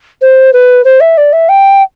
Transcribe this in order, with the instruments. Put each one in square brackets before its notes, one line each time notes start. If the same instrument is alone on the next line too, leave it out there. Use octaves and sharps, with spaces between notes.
[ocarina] C5
B4
C5
E5
D5
E5
G5